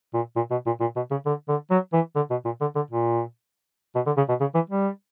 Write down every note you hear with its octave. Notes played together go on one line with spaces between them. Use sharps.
A#2
A#2
B2
A#2
A#2
B2
C#3
D3
D3
F#3
E3
D3
B2
A#2
D3
D3
A#2
B2
D3
C#3
B2
C#3
E3
G3